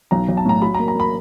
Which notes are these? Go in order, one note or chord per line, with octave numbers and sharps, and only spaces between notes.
B1 A#5
B1
A5
A2 A#5
F#3 B5
A#5
A#3
A#5
A#3 B5